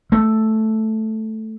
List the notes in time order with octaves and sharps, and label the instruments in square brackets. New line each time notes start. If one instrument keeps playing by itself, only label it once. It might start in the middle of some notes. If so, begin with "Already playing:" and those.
[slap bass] A3